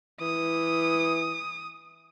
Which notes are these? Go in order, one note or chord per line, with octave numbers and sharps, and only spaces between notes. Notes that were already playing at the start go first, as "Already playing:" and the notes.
E3 D#6